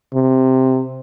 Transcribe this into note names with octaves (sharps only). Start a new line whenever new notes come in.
C3